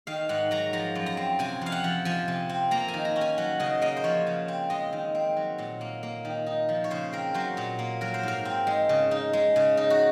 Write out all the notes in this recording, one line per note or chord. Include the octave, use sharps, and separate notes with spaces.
D#3 F5
G#2 F#5
F#3 A#5
F3 A#5
F#2
A#5
C4
C3 G#5
F2 F5
F#5
F3
F3 G#5
C3
C4
A#3 A#5
G#5
D#3
A#5
C#4
G#5
F#3 F#5
C#3 D#5
A#3 D#5
C5
F3 C#5
C#3
C4
G#3 D#5
D#3
C4
F#3
A#2
A#3
A#3
D#3
D#4
F3
C#5
C#3 C5
C4 A#4
F#3 C5
A#2
A#3
F#3 A#4
C5
G#2 A#4
C4
G#3
C#3
D#4
G#3
C#3
D#4
F#4